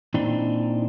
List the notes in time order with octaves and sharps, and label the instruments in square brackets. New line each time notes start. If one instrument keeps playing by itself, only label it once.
[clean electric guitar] A#2 E3 C4 D4 D#4